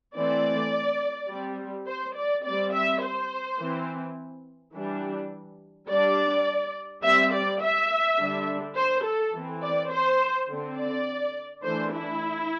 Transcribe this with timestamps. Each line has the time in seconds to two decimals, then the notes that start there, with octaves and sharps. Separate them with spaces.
0.15 E3 A3 C4 D5
1.29 G3 C4
1.87 C5
2.15 D5
2.44 G3 C4 D5
2.73 E5
3.01 C5
3.59 E3 C4
4.74 E3 G3 D4
5.89 G3 D4 D5
7.03 G3 C4 E5
7.33 D5
7.61 E5
8.18 D3 G3 D4
8.77 C5
9.04 A4
9.33 E3 C4
9.62 D5
9.90 C5
10.49 D3 C4
10.77 D5
11.63 E3 A3 D4 C5
11.92 E4